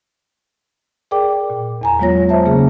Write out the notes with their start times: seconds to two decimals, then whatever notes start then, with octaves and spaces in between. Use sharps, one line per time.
1.11 G#4 A#4 D5 G5 D6
1.50 A#2
1.81 E2 G#5 A#5
2.00 F#3 G#3 B3 F4 C#5 A#6
2.29 C5 E5 A5
2.45 C#3 A#3 C#4 G#4